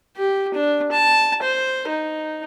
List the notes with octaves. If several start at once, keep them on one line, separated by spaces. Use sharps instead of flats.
G4
D4
A5
C5
D#4